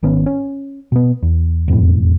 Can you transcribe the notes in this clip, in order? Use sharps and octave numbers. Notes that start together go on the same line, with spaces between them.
G#1 D#3 B3 C#4
C#4
B2 B3
E2
E1 F2 A2